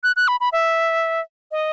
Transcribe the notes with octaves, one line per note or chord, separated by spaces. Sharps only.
F#6
F#6
B5
B5
E5
D#5